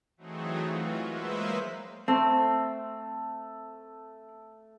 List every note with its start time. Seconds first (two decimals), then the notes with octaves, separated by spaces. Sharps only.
0.17 E3 F#3 A3 C4 D#4 G#4
0.67 E3 F4 F#4
1.03 F#3 G#3 A#3 B4 C5 E5
2.08 A3 C4